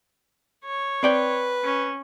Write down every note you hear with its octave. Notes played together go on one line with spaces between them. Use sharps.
C#5
C4 B4 D5 G5
C#4